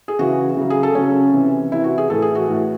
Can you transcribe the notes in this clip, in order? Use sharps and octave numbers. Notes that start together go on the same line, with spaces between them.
G#4
C#3 E3 F#4
C#3 F#3
G#4
A4
C#3 F#3 C#4
C3 E3
C3 E3 E4
F#4
G#4
A2 E3 A4
G#4
F#4
A2 E3